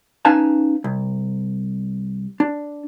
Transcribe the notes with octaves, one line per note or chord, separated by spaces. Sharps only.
C#4 D#4 B4 F5 G#5 A5
C2
D4